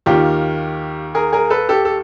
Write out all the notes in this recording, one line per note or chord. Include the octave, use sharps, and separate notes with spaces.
D#2 D#3 F4 G4
G#4 A#4
G#4 A#4
A4 B4
G4 A4
A4